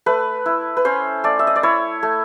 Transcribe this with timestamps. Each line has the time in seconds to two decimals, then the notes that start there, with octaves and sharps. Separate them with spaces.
0.06 A3 B4
0.46 E4
0.77 B4
0.85 C#4 C5
1.24 A3 D5
1.39 E5
1.47 D#5
1.56 D5
1.63 E4 C#5
2.03 A3